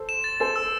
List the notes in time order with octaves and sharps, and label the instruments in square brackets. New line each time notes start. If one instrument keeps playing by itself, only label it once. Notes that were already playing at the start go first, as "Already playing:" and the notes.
Already playing: [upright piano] A4 C5
[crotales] E7
A6
[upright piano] A4 C5 [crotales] A6
[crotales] E6